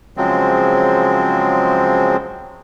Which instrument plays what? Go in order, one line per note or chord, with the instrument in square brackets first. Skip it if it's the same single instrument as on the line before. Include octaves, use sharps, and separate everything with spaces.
[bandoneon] C#3 F3 F#3 G#3 C4